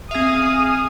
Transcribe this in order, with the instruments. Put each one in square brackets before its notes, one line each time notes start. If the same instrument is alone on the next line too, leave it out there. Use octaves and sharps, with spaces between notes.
[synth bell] C4 E5 [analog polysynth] G#4 F5 [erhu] D#6